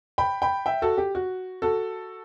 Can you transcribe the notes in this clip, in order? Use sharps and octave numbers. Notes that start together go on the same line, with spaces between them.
G5 B5
G5 B5
E5 G5
F#4 A4
G4
F#4
F#4 A4